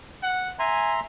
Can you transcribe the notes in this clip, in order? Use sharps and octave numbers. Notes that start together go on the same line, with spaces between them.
F#5
E5 G#5 A#5 C6